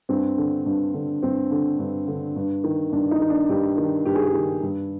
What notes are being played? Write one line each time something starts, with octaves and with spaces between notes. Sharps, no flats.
G2 C4
D3
G2
D3
G2 C4
D3
G2
D3
G2
D#3
G2 D4
D#4
D#3
D4
G2 G4
D#3
G2 G4
G#4
G4
D#3
G2